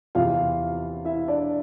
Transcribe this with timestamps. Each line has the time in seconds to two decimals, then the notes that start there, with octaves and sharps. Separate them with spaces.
0.15 E2 C3 E3 F4 F5
1.05 E4 E5
1.27 D4 D5